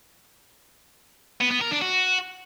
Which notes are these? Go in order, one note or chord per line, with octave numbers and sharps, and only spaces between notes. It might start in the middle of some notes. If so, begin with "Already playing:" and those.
B3
B3
A#4
D4
F#4